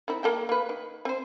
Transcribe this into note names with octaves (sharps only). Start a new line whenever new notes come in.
D#3 C4 E4
A#3 A4 G5
A#3 B4
D#3
C4 C5